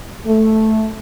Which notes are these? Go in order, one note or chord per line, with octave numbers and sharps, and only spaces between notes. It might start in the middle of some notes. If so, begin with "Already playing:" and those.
A3